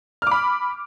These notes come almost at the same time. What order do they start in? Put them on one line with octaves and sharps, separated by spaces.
F6 D6 B5